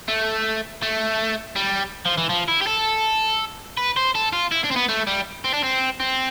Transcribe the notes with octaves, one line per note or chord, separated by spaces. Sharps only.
A3
A3
G3
F3
E3
F3
E4
G4
A4
B4
C5
A4
F4
E4
D4
C4
B3
A3
G3
C4
D4
C4
C4